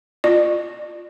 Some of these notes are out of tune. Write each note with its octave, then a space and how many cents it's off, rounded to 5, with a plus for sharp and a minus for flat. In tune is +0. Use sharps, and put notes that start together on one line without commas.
F4 +0 D5 +40